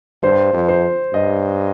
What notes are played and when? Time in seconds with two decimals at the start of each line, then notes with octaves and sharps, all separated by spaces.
0.23 G2 C5
0.53 F2
0.69 C5
1.14 G2 D#5